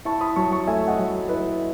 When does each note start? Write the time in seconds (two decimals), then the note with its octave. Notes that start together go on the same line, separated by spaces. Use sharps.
0.05 E4 A5 C#6
0.21 B5 D#6
0.36 F#3 A5 C#6
0.51 A5 C#6
0.67 A3 E5 G#5
0.88 D#5 F#5
0.99 F#3
1.29 E4 B4 D#5